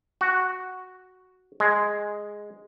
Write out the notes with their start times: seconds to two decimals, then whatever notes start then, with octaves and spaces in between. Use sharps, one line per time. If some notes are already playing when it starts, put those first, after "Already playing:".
0.21 F#4
1.60 G#3